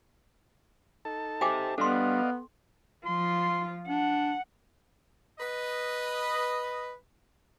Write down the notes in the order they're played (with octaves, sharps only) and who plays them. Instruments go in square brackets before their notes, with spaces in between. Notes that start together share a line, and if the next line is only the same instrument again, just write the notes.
[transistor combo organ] D#4 A4 A5
[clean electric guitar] G4 C5 E5 [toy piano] G5 G#5 D6
[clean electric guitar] G3 D4 [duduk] B3 [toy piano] A4 C6 [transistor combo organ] D5 D#5 F5
[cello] F3 F4 [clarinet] C6
[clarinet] D4 [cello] F#5
[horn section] B4 D#5